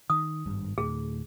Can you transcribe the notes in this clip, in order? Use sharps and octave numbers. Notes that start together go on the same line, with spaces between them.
D#3 D#6
G#1 G2
D2 A2 G#4